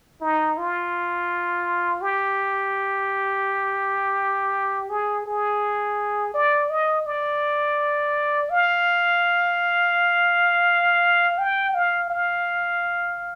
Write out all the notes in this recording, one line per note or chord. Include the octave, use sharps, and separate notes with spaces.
D#4
F4
G4
G#4
G#4
D5
D#5
D5
F5
G5
F5
F5